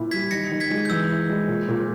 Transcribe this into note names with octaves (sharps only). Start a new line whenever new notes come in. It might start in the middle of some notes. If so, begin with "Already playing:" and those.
Already playing: A#2 E4
G3 G#6 B6
D#3 A#6 C#7
D#3
G#6 B6
G#3
G6
E3 E6
E4
G#3
A#2
A#2